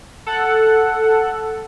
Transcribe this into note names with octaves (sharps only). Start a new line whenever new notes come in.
A4 F#5